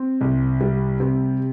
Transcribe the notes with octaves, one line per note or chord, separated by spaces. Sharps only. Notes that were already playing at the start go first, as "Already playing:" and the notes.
Already playing: C4
C2
G3
C3